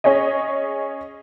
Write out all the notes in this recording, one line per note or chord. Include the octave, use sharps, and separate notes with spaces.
C#4 G#4 C#5 D#5